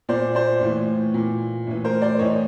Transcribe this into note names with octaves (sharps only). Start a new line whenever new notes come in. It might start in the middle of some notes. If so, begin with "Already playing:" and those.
A#2 C5 D5
C5 D5
A2 E3
A#2
A2 E3
A#4 C5
C5 D5
A2 E3 C#5 D#5